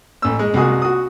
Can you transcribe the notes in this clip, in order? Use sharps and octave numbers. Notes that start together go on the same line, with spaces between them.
A1 E6
G#3
C2 G#3 F#4 G#4 D#6
F#4 D#6